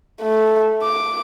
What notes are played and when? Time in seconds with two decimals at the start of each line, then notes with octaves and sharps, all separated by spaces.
0.22 A3
0.83 D6